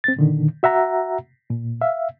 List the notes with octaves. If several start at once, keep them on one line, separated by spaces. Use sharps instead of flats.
C4 A6
A#2 D3 D#3
F#4 E5 F#5 A#5
A#2
E5 F5